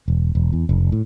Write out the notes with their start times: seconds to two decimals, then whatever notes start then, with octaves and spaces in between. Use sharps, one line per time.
0.08 E1
0.35 E1
0.53 E2
0.69 F1
0.92 A2